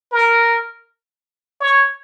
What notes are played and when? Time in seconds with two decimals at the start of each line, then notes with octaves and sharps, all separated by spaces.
0.12 A#4
1.60 C#5